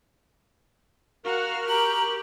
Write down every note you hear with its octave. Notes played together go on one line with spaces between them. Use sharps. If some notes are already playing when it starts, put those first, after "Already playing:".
F#4 A#4 F5 F#5 C#6 F6
G4 A#5 F#7